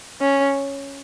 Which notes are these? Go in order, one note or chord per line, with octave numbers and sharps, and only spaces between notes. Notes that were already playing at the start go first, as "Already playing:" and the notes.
C#4